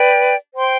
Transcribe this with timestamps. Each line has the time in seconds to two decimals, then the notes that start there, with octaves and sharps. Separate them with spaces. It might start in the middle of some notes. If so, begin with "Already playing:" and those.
Already playing: B4 D5 G5
0.53 C5 G5 C6